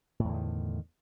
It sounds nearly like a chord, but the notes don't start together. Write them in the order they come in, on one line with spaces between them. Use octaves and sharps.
A2 E2 D3 D#3